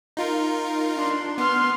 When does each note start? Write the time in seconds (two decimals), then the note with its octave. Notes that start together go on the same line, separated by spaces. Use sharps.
0.17 D#4 F4 A#4
0.96 D4 C6
1.38 B3 C6 F6